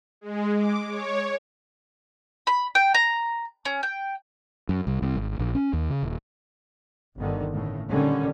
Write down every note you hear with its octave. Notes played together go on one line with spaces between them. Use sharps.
G#3
D6
C#5
B5
G5
A#5
C#4
G5
F#2
C2
C2
G#1
A#1
C#4
D#2
C#3
D#1
G1 D3 D#3
A2 C#3
A#2 D3 D#3 G3 C#4